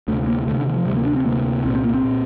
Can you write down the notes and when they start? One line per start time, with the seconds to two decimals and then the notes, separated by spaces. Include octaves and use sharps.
0.08 D2 C3 A3
0.27 A#3
0.47 D2 A3
0.51 C3
0.57 D3
0.67 D#3
0.77 F3
0.86 D2 C3 G3
0.96 A#3
1.06 D4
1.16 C4
1.26 D2 C3 A#3
1.65 C2 C4
1.69 A#2
1.75 C4
1.85 A#3
1.94 C4
2.05 A#2